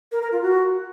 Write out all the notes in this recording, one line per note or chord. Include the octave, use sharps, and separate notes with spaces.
A#4
A#4
F4
F#4